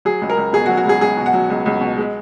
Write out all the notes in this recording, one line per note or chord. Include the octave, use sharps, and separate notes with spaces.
F#3 G#4
C#2
A#4
C#2
B2 G#4
F#4
F#3
F#4
C#2 G#4
C#2 G#4
B2
F#5
F#3
C#2
C#2
B2
G#3